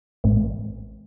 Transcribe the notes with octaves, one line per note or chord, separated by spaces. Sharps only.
A1